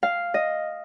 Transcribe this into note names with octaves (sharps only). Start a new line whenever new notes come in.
F5
D#5